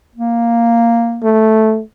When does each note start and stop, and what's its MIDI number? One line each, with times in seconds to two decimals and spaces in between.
0.15 1.40 58
1.23 1.81 57